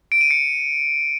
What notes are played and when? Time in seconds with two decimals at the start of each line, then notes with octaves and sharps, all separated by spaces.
0.12 D7
0.21 D#7
0.31 C#7